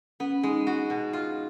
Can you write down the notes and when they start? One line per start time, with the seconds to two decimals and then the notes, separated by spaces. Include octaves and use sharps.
0.20 B3 C#4
0.43 G#3 D#4
0.67 F#4
0.90 B2
1.13 F4